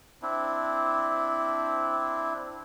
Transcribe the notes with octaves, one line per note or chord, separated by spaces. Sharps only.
C4 D4 E4